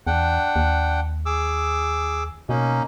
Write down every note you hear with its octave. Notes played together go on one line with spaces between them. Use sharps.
E2 D4 F#5 G5
D#2
G#4 D6 E6
B2 A#3 C#4 D#4